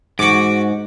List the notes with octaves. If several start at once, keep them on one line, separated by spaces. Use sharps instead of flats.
G#2 F#4 D6